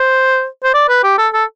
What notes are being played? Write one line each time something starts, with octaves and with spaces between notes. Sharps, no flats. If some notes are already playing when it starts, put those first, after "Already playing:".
Already playing: C5
C5
D5
B4
G4
A4
A4